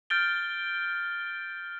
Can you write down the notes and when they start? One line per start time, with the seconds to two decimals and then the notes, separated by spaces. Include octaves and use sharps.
0.10 F6 G6 A6 D7 G7